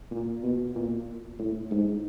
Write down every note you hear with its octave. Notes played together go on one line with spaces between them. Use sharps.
A#2
B2
A#2
A2
G#2